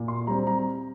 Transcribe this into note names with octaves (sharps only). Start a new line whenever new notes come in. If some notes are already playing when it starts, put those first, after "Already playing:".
Already playing: A#2
C6
G3 C4 A#5
A#5